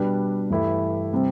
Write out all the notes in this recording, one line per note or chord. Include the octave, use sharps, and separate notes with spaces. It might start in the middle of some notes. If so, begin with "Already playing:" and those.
Already playing: B2 G3 D4 G4 B4
G2 E3 A3 E4 G4
C3 G3 C4